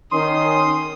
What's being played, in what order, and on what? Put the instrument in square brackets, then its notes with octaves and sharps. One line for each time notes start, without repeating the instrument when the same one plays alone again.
[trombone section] D#3 C#4 [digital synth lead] C6 [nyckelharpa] D#6